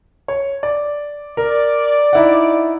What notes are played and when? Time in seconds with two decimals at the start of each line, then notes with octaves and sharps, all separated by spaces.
0.28 C#5
0.63 D5
1.37 A#4 D5
2.13 D#4 E4 F#5